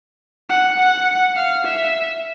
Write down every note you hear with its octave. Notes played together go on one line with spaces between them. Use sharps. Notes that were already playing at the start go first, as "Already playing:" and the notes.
F#5
F#5
F5
E5